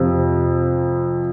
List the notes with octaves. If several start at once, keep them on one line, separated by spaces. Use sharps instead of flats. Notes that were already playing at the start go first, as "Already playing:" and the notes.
Already playing: F2 C3 F3